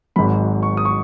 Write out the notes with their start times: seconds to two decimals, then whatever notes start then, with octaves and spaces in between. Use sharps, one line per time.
0.16 G#1 G#2 F#3 B5
0.63 C#6
0.77 D#6
0.85 C#6